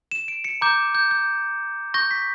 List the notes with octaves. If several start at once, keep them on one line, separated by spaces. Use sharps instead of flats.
E7
D7
C#7
A#5 D6 G6
G6
G6
C#6 G6 A#6
B6